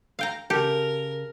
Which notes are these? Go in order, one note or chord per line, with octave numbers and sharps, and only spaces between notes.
F5 G5 A#5
C#3 G4 A4 A#4